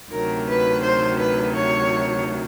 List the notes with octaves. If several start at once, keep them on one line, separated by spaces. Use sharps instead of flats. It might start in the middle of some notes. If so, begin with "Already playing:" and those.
D2 C3 D#3 F#3 A#4
B4
C5
B4
C#5